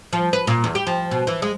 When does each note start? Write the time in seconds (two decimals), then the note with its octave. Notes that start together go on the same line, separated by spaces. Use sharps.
0.13 F3
0.33 B4
0.47 A#2
0.64 E2
0.75 G4
0.87 F3
1.11 B2
1.27 E3
1.42 G#3